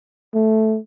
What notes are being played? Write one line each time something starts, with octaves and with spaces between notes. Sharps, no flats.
A3